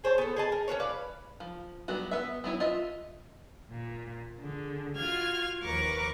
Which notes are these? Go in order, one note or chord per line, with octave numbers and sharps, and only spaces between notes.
G#4 C5 C#5 A5
B3 A4
G#4 D#5 A5
A#4
C#4 F4 B4 C#5
B4 D5 F5
F3
F#3 G3 B3 F#4
B3 E5
F#3 B3 E4 C#5
F4 D#5 E5
A#2
D3 G#4
F4 F#4 F6 G#6
D#2 F3 A#4 B4 C#6 D6